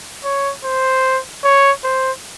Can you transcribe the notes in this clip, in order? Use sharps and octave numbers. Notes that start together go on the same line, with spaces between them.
C#5
C5
C#5
C5